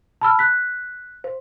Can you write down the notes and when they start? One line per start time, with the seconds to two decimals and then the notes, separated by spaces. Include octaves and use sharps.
0.21 A5 B5 E6 F6
0.39 F#6 B6
1.24 C5